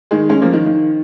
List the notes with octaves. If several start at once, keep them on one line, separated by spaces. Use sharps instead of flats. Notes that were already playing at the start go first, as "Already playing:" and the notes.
D#3 G#3
G#3 C#4
F3 A#3
D#3
D#3